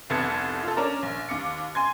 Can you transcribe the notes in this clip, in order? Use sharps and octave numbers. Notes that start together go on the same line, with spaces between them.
F1 C2 B3 A4 G#6 C#7
F4 A4
C#4 D4 A#4 D5
A#1
D#2 D6 C#7
G#5 C6 G#6